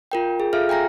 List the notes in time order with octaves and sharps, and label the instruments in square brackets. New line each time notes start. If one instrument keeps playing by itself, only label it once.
[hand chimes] F4 A#4 G5
G#4
F4 G#4 A4 E5 F5 F6
G5 G#5 A#5 A#6